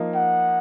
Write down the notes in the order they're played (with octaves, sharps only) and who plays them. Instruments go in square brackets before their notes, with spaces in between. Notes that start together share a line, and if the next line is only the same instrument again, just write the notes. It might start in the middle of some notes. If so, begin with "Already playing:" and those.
Already playing: [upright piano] F3 A#3 D#4
[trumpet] F#5